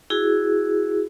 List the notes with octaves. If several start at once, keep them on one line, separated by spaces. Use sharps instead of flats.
E4 F#4 G#4